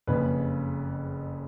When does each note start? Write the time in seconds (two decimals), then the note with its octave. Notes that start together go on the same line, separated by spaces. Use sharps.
0.07 F#1 F2 C#3 B4